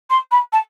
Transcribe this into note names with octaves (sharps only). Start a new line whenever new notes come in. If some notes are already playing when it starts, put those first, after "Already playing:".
C6
B5
A5